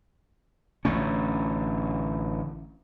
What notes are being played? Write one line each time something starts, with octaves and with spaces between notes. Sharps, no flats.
A1 D3 A3 C#4